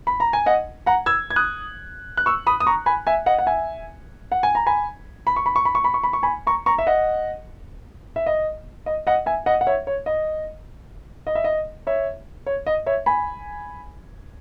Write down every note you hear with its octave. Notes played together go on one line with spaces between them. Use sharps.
B5
A#5
G#5
D#5 F#5
F#5 A#5
E6 G#6
G#6
D#6 F#6
F#6
C#6 E6
B5 D#6
D#6
A#5 C#6
G#5 B5
E5 G#5
D#5 F#5
F#5
E5 G#5
F#5
G#5
A#5
G#5 B5
B5
C#6
B5
C#6
B5
C#6
B5
C#6
B5
C#6
G#5 B5
A#5 C#6
A#5 C#6
E5
D#5 F#5
E5
D#5
D#5
D#5 F#5
E5 G#5
D#5 F#5
F#5
C#5 E5
C#5
D#5
D#5
E5
D#5
C#5 E5
C#5
D#5
C#5 E5
G#5 B5